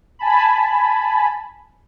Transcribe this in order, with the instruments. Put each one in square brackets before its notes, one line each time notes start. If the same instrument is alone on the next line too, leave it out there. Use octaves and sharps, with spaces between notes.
[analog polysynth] G#5 A5 B5